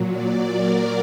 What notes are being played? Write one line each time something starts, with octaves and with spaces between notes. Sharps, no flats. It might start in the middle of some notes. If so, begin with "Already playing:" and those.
Already playing: A#2 F#3
D5
A#4